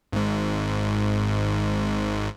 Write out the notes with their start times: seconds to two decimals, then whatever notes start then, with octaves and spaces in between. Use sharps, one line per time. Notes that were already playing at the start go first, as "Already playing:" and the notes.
0.13 G#1 G#2